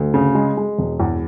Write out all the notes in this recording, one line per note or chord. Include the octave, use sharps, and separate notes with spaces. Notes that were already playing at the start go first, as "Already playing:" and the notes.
Already playing: D2
C#3
G#3
G#3
E1
E2